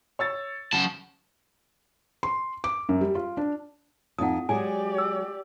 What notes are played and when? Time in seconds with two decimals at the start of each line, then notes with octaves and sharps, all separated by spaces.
0.19 C#5 E6 A6
0.73 C#3 F#3 F#5 A5
2.23 C6
2.64 D6
2.89 F#2
3.01 G3
3.15 F4
3.37 D4
4.18 F2 D#4 F#5 D#6
4.49 F#3 G#3 G4 G#4 D5 G#5
4.98 E6